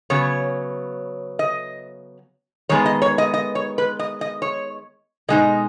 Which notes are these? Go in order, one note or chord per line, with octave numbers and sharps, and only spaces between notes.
C#3 F#3 B3 C#5
D#5
D#3 G#3 B3 C#5
D#5
C#5
D#5
D#5
C#5
B4
D#5
D#5
C#5
B2 G#3 D#4 D#5